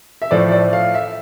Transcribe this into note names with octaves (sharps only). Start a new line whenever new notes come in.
E5
A2 F3 A3 D5
D5
F5
E5